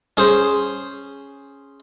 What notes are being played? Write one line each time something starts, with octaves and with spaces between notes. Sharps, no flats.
C#4 G#4 C5